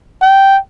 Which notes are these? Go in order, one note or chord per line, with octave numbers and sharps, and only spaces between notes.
G5